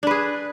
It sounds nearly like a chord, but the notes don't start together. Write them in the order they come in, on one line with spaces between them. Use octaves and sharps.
D4 B4 G#4